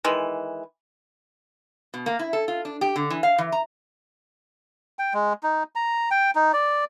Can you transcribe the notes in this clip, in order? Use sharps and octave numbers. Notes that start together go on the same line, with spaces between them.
D#3 E3 G#3
B2
A#3
E4
A4
F4
D4
G4
D3
E3
F5
E3
A#5
G5
G#3
D#4
A#5
G5
D#4
D5